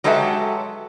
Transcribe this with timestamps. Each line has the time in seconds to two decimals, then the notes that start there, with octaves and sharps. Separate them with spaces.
0.04 F#3 G#3 G4 A4 B4 E5